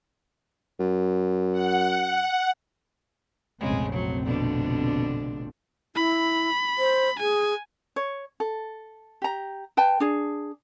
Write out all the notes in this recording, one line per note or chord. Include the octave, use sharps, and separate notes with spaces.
F#2
F#5
F1 A#1 C#3 G#3 C4
F#3
B2 D3 D4
E4 B5
C5
G#4 G#5
C#5
A4
G4 A#5
B4 G5 A5
D4 G#4